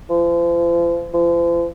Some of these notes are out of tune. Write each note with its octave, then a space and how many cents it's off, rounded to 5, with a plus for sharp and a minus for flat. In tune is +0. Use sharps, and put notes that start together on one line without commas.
F3 -40
F3 -40